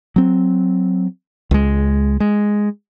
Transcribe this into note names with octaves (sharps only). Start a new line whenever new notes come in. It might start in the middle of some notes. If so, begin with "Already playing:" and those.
F#3 C4
C#2 G#3
G#3